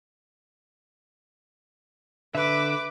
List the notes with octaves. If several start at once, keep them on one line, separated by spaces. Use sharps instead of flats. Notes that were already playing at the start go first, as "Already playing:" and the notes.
D3 B4 E5 D6